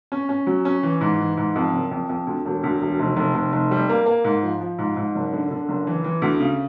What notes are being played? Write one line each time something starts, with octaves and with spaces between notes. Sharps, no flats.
C#4
C#4
F#3
C#4
E3
G#2
E3
G#2
F2
F#1
F2
F2
D2
E1
D2
E1
F1
F1
F1
F1
G3
A#3
A#3
G#2
F3
F3
G#2
G#2
F#1
D3
D3
F#1
E3
E3
D2
C#3